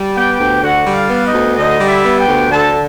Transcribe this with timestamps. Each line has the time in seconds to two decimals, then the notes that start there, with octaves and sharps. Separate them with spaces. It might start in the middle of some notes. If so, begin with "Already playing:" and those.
Already playing: G3
0.16 B3 G4 G5
0.39 D2
0.62 D3 F#4 F#5
0.86 G3
0.93 F4 F5
1.09 B3
1.25 D#4 D#5
1.33 D2
1.56 D3 D#4 D#5
1.80 G3
1.88 E4 E5
2.04 B3
2.19 G4 G5
2.28 D2
2.50 D3 A4 A5